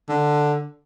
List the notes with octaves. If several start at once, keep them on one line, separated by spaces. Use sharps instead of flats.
D3